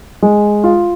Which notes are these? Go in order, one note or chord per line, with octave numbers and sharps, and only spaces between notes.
G#3
F4